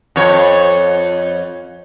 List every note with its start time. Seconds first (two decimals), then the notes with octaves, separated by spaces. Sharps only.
0.16 F2 C#5